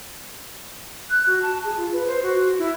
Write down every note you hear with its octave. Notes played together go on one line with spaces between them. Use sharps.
F#6
F#4
A5
G#4
F4
B4
C5
F#4
E4